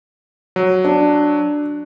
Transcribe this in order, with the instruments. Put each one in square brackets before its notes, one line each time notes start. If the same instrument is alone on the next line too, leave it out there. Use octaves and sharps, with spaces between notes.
[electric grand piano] F#3
[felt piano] D4